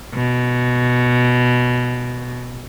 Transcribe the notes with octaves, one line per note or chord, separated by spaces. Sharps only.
B2